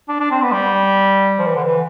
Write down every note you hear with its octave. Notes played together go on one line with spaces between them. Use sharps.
D4
D4
C4
B3
G3
F3
E3
D3
E3